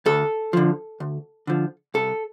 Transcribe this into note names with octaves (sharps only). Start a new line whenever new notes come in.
D2 A4
D3 F3
D2
D3 F3
C2 A4